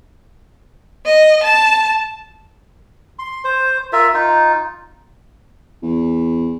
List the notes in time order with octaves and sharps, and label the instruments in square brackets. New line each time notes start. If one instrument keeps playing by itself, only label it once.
[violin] D#5
A5
[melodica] C6
C5
F4 A#4 E5
D#4 F4
[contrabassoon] E2